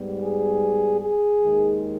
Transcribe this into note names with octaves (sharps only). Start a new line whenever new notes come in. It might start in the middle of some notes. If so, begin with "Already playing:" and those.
Already playing: G#2 G3 B3
G#4
G#4
D#2 D#3 G#3